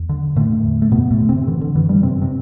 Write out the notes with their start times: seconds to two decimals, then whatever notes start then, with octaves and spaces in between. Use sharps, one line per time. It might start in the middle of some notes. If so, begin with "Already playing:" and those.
Already playing: E2
0.09 D3
0.36 A2 D3 A3
0.64 E2
0.82 A3
0.92 F#2 B2 B3
1.11 A2 A3
1.20 D3
1.29 C3 C4
1.47 D3 E3
1.61 D3
1.75 F#2 E3
1.89 G2 G3
2.03 G2 C3 C4
2.22 C3 C4